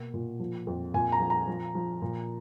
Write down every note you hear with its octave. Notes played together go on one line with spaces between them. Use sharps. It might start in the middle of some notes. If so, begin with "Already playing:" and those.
Already playing: B2 A#3
A#2
F3
F2
A#2 G#5
A#5
F3
A#5
F3
F3
A#2